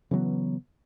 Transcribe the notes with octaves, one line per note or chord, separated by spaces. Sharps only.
C#3 E3 F#3 B3